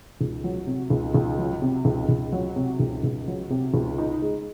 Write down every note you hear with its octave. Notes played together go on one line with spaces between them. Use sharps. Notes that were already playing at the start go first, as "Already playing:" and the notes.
C#2
F#3
C3
C#2
C#2
F#3
C3
C#2
C#2
F#3
C3
C#2
C#2
F#3
C3
C#2
D#4
G#3